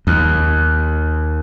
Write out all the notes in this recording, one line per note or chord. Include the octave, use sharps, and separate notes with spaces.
D#2